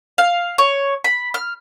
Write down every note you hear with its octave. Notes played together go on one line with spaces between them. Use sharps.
F5
C#5
B5
F6